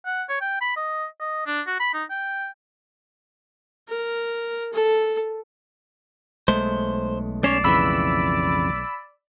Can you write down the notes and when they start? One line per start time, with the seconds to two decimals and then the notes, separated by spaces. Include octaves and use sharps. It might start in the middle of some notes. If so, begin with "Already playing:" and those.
0.06 F#5
0.29 C#5
0.41 G5
0.61 B5
0.76 D#5
1.19 D#5
1.47 D4
1.67 F#4
1.80 B5
1.94 D#4
2.10 G5
3.88 A#4
4.73 A4
6.48 B1 G#3 A3 C5
7.44 C#4 C#5 D5 C7 E7
7.64 F2 C#3 E3 B5 E6